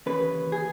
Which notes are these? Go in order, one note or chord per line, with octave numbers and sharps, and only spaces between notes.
D#2 C#3 E3 B4
G#4